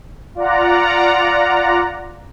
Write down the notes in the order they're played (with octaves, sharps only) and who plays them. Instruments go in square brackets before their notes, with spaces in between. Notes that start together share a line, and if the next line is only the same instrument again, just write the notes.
[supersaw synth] F4 D5 F#5 A#5